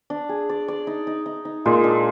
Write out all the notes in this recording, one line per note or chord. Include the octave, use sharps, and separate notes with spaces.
D4
G#4
D5
D5
D#4
D#4
D#4
D#4
A#2 G#3
D4